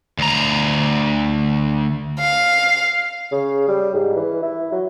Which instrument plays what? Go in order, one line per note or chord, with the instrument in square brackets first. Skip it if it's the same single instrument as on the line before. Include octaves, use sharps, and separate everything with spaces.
[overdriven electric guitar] D2 A#5
[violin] F5
[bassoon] C#3
G3
G#2
E3
E4
F#3